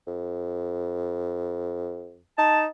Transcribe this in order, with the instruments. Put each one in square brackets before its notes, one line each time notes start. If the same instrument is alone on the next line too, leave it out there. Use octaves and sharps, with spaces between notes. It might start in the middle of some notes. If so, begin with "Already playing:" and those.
[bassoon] F2
[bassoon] D#4 [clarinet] A5